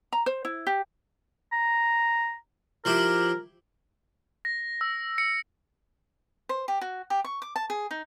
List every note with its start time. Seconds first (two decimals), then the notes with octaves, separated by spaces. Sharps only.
0.13 A#5
0.26 C5
0.45 E4
0.67 G4
1.52 A#5
2.85 F3 E4 G4 A#4
4.45 A#6
4.81 E6
5.18 C#7
6.49 C5
6.68 G4
6.81 F#4
7.10 G4
7.24 C#6
7.42 D6
7.56 A5
7.70 G#4
7.91 D#4